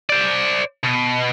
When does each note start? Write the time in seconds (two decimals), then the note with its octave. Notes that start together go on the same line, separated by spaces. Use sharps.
0.09 C5 D5
0.84 B2